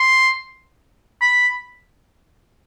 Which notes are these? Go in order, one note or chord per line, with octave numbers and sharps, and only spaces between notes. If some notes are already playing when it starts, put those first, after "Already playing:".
Already playing: C6
B5